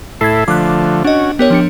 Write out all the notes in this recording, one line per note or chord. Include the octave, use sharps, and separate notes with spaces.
A2 E4 A4 G#6 B6 C7
D3 F3 A3 D6 F#6
C#4 D4 F#4 D#5
B3 G4 A#4 C#5
F3 D4 C#7